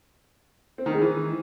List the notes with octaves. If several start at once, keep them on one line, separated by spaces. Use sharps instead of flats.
C4
D#3
G#3
E3